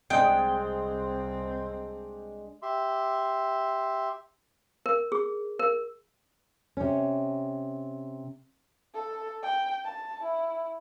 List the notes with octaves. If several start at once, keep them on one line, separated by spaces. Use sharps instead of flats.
C2 G#3 C4 D4 G#4 G5
G4 E5 C6
A#4
G#4
A#4
C3 C#4
A4
G5
A5
E4